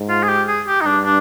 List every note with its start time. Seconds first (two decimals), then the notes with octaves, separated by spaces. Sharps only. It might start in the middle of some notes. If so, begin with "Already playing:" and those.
Already playing: G#2
0.09 F4
0.23 G#4
0.28 G4
0.48 G#4
0.67 G4
0.81 D#4
0.85 G2 D4
1.05 D4